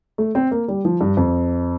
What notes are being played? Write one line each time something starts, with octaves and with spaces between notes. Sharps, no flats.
A3
C4
A#3
G3
F3
G2
F2